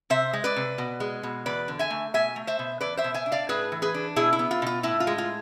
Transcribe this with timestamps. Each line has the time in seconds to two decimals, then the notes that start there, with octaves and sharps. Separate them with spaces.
0.10 C3 C5 E5
0.33 G#3
0.44 B4 D5
0.56 C3
0.78 B2
1.00 G#3
1.23 B2
1.46 E2 B4 D5
1.68 D3
1.79 E5 G#5
1.90 A3
2.14 B2 E5 G#5
2.36 A3
2.47 C5 E5
2.59 B2
2.81 E2 B4 D5
2.97 C5 E5
3.04 B2
3.14 E5 G#5
3.26 D4
3.32 D5 F5
3.49 A2 G#4 B4
3.72 E3
3.82 G#4 B4
3.94 D4
4.16 B2 E4 G#4
4.33 E4
4.39 B3
4.51 F4
4.62 B2 F4
4.83 A2 E4
5.00 F4
5.07 G#3
5.18 F4